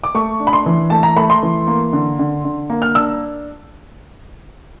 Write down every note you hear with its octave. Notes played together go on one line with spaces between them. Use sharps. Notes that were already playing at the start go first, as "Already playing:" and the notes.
D6
A3 C#6
D4
B5
C6
E3
A3 A5
A#5
A3 B5
C6
E3
A#3
D3
D3
D3
A#3
F6
D4 E6